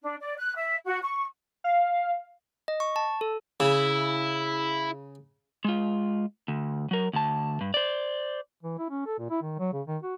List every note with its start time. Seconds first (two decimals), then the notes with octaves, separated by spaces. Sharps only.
0.02 D4
0.20 D5
0.37 F#6
0.55 E5
0.85 F#4
1.02 C#6
1.64 F5
2.68 D#5
2.80 C#6
2.96 A5
3.21 A4
3.60 C#3 E4
5.65 G#3 F4
6.48 D2
6.91 F#3 A#4
7.13 D2 A5
7.61 G2
7.74 C5 D5
8.63 E3
8.78 E4
8.90 C#4
9.06 A4
9.19 A#2
9.30 E4
9.42 D#3
9.59 F#3
9.73 C#3
9.87 D#3
10.03 F#4